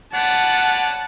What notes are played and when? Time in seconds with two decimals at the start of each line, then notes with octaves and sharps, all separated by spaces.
0.13 B4 C#5 D5 F#5 A5